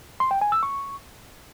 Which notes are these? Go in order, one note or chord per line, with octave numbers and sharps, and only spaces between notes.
C6
G5
G#5
E6
C#6